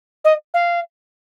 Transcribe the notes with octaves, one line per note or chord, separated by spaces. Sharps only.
D#5
F5